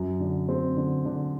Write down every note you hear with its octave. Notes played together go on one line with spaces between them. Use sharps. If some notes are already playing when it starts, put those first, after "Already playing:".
Already playing: F#2
D3
C4
D3
D3